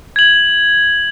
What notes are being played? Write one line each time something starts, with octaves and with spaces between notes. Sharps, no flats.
G#6 F#7